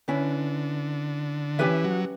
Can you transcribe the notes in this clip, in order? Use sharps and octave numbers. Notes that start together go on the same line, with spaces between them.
D3 C#4 E4 B4
E3 C#4 G4 B4 E5
F#3